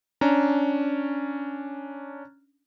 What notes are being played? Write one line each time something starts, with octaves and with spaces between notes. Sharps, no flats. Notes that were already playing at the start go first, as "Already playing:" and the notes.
C#4 D4 A#5